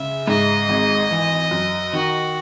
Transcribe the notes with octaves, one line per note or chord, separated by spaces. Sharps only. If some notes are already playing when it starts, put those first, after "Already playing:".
Already playing: C#3 G#3 E5
G#2 D#5
G#1
E3
F#2
D#3 F#4